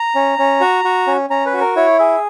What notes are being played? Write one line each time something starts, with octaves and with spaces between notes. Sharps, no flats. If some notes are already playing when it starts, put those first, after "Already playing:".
Already playing: A#5
C#4
C#4
F#4
F#4
C#4
C#4 A#5
B4
F#4
A#4
E4 C#5
G#4 E5